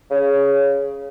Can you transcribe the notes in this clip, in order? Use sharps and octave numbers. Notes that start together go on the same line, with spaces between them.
C#3